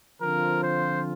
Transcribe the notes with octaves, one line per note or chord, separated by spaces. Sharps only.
D3 F3 C4 F4 A#4
C5